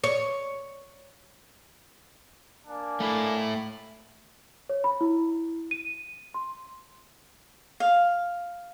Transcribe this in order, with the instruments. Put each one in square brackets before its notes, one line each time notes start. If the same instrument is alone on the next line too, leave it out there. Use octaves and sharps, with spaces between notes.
[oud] C#5
[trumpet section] A#3 D4 G#5
[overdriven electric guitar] A3 E4
[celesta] C#5
B5
E4
D#7
C6
[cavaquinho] F5